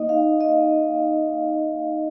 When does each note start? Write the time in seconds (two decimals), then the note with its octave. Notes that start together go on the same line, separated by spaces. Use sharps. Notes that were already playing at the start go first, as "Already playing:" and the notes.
Already playing: A#3 D#4 D#5
0.09 F5
0.40 D#5